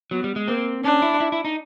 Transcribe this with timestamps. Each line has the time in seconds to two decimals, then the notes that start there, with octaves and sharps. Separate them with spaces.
0.11 F#3 B3
0.24 G3
0.36 G#3
0.48 A#3 C4
0.84 C#4 D4
1.02 E4
1.20 E4
1.32 E4
1.45 D#4